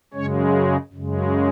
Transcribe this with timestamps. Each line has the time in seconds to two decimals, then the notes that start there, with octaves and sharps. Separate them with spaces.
0.13 F#2 C#3 G#3 C#4 C#5
0.93 F#2 C#3 G#3